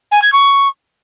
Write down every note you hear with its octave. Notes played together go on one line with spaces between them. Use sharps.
G#5
G#6
C#6